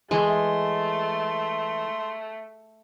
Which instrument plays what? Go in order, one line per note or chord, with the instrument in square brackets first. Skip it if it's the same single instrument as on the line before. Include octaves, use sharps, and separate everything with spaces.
[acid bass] E3 [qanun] G#3 [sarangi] A3 [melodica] C6